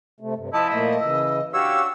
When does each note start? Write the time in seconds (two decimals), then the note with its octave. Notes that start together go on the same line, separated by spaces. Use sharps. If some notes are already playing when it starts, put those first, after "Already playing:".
0.20 C3 A3
0.36 G2 C3
0.53 F3 E4 D#5 A5
0.70 A#2 A3 A#3 D#5
1.01 C#3 E3 E6
1.53 D4 F#4 G4 C#5 F5 E6